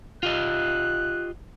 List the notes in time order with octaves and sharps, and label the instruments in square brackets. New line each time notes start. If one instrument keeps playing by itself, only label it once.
[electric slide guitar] F4 G4 D#5 [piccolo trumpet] F#6